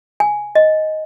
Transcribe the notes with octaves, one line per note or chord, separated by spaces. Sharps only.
G#5
D#5